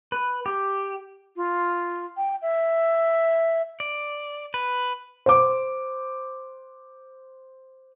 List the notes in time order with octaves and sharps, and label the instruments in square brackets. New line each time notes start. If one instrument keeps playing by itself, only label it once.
[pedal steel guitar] B4
G4
[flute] F4
G5
E5
[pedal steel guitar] D5
B4
[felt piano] C5 D6